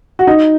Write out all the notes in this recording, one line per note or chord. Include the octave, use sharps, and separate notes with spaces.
F#4
D#4